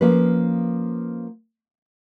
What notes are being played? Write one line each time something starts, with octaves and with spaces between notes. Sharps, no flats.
F3 A#3 C#4 B4